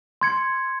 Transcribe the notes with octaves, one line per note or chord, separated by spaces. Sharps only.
C6 G#6 C#7